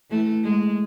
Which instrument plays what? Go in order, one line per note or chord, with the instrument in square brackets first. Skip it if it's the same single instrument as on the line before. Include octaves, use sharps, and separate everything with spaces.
[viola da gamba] E3 A3
G#3